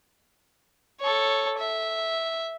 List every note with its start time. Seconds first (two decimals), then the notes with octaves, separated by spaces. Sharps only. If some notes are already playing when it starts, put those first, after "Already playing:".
1.00 A4 C#5
1.59 E5